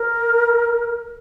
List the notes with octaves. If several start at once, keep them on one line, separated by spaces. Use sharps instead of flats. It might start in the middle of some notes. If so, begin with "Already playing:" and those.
Already playing: A#4